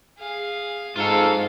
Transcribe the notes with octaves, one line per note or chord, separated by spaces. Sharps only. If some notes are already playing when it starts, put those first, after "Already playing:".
G#4 F5
G#2 F4 A4 F5